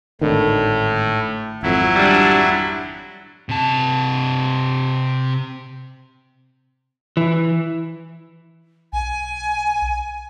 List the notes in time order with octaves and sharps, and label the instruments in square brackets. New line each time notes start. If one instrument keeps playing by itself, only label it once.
[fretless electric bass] G#1 D3 D#3 [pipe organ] A2
[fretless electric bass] G#1 F2 [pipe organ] F#3 E4
[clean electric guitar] G3 D4
[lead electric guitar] C3 A5
[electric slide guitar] E3
[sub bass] B1 [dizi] G#5